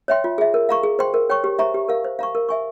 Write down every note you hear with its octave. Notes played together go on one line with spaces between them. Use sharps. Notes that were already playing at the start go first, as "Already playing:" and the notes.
C#5 E5 G5 C6
F4
G#4 E5
A#4
F5 A#5 C#6
G#4
C5 G5 C6
A#4
C#5 G5 C#6
G4
C5 E5 A#5 C#6
G4
A#4 F5
C5
F5 A#5 C#6
A#4
E5 G#5 C#6